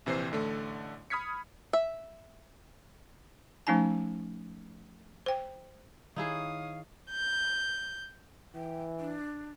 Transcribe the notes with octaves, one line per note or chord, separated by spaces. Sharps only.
A#1 C3 E3 C4 C5 C7
A1 D3 A3
B5 D#6 F6 G#6 B6 C#7
E5
F3 A3 C#4 D#4 G#5 A5
C5 G5
D#3 D#4 E4 G#4 C#5 F5 D#6
G6
E3 G5
D4